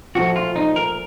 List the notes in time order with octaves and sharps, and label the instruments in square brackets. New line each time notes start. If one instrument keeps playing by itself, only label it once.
[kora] A#2 F3 A3 [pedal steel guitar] F#4
[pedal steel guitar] F4
D#4
A#4